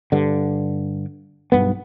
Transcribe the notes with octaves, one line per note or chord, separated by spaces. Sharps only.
G2 D3
B1 G2 B3